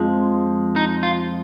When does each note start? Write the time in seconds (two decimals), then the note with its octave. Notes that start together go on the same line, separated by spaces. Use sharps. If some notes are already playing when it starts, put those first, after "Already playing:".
Already playing: F2 F3 G#3
0.76 D#4
1.03 F4